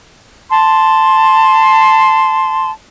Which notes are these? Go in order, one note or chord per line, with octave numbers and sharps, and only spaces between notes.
A5 C6